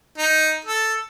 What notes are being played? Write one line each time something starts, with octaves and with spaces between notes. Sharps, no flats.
D#4
A4